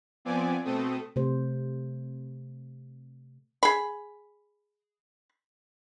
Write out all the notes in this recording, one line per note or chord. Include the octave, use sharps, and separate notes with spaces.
F3 B3 C4 D5 G#5 D6
B2 A3 C4 A4 D#6
C3 A3 C5
G#4 B5